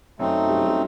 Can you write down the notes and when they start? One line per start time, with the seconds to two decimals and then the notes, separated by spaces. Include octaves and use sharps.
0.19 F#2 F#3 A3 C4 D#4
0.49 G3
0.58 F#3
0.66 G3